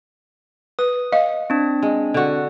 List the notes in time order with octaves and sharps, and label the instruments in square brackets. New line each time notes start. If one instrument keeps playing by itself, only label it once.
[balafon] B4 [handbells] D#6
[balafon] D#5 F5
[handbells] C4 D4
[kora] G#3
D3 F#4